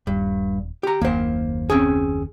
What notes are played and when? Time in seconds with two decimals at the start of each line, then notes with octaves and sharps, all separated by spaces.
0.07 D#1 G2
0.83 G4 A#5
1.01 F#1 D#2 A#3 C5
1.70 C4 C#4 G#4